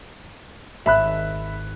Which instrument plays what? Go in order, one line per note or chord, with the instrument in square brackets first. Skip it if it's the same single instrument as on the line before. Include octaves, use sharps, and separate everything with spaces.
[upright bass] G#1 [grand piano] E5 B5 F#6